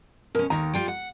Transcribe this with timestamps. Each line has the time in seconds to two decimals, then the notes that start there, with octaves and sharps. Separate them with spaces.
0.35 B2 C#4 A#4
0.50 D#2 D#3 A#5
0.74 G3 F4 G5
0.88 F#5